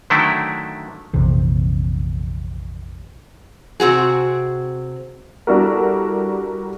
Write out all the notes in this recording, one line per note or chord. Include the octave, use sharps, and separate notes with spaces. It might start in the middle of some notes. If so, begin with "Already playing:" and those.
D3 D#3 F#3 A3 D4 E4
A#1 F2 C3 E3
C3 C4 F#4 G#4
G3 D4 E4 F#4 A4 A#4